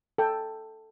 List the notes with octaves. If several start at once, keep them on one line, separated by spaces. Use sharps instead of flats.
A4 G5